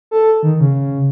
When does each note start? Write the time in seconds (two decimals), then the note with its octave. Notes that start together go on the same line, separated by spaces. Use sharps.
0.11 A4
0.43 D#3
0.60 C#3